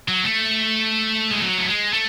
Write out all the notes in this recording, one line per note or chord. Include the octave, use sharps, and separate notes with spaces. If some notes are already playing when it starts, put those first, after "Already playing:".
F#3
A3
G#3
F#3
A3
G#3
A3